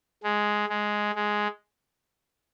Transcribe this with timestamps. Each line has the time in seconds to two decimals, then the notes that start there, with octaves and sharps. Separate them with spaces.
0.23 G#3
0.69 G#3
1.15 G#3